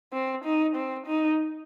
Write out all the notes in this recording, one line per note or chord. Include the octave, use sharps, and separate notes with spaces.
C4
D#4
C4
D#4